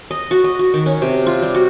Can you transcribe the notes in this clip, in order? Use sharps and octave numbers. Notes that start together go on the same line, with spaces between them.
D#5
F#4
D#5
F#4
D#3
C#4
C3
F4
G3
F#4